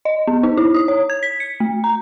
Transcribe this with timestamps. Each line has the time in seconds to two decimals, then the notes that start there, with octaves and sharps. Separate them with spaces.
0.05 D#5
0.27 B3
0.43 D#4
0.57 E4
0.74 D#6
0.88 C#5
1.10 G#6
1.23 B6
1.40 C#7
1.60 A3
1.84 A#5